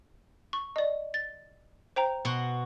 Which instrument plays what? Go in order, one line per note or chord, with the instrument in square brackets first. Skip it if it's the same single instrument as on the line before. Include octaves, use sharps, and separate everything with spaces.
[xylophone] C#6
D5 D#5
A6
C5 G5 A#5
[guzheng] B2 F#4 C6